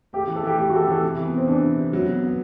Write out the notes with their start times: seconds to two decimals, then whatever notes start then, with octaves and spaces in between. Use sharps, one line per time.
0.13 A3 G4
0.24 G4
0.28 E3
0.36 A4
0.44 E3 G4
0.58 A3 G4
0.69 F#4
0.72 E3 A4
0.80 G4
0.88 E3 A4
1.02 C3
1.17 E3
1.25 B3
1.33 C3 C4
1.47 E3 D4
1.63 C3
1.78 C3
1.93 F#3
2.08 B2
2.23 B3